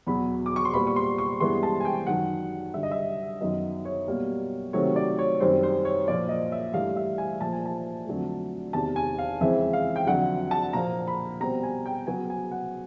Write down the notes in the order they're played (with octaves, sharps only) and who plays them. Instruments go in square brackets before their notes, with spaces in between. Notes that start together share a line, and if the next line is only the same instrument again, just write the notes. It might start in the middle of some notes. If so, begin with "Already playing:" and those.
[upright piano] E2 B2 F#3 B5
D6
C#6
C6
A#2 G3 B3 B5
C#6
C6
C#6
G2 E3 G#3 B3 C6
A5
G#5
G5
F#2 D#3 F#3 F#5
G2 D3 G3 E5
D#5
E5
F#2 D#3 F#3 B3 D#5
C#5
B2 G3 A#3
C3 D#3 F#3 A3 C4 C#5
D5
C#5
F#2 D#3 G3 C4 C5
C5
C#5
A#2 F3 A#3 D5
D#5
E5
G2 E3 A3 F5
E5
G#5
A#2 F3 A#3 A5
G#5
A5
F2 D3 F#3 A3
E2 C3 D#3 A5
G#5
F5
F2 C#3 E3 G#3 C4 E5
F5
G5
F2 D3 F#3 F#5
A5
A#2 F3 A#3 A#5
B5
B2 G3 C4 A#5
G#5
G5
C#3 F#3 B3 G#5
G#5
F#5